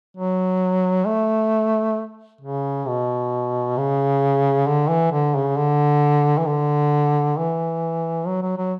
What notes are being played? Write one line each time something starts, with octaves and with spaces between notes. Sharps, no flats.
F#3
A3
C#3
B2
C#3
D3
E3
D3
C#3
D3
E3
D3
E3
F#3
F#3
F#3